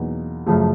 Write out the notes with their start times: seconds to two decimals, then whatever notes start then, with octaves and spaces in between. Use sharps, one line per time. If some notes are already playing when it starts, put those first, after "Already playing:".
Already playing: E2 B2 F#3 A#3 D#4
0.46 F#2 C#3 F3 A3